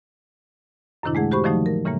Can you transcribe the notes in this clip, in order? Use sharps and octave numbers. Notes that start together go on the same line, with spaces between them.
F#2 A2 C3 D#3 D4 E4
G#3 A3 G#4 F#5
F#4 G4 C5 B5 C#6
D3 D#3 F3 F#3 A3 D#4
A#4
A2 C#3 E3 G3 A#3